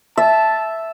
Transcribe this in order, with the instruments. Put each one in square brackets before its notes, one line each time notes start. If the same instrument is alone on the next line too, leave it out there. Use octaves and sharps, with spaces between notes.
[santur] E5 [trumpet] A5